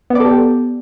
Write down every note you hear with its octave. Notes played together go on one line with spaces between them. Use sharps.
B3 G4 A4 D5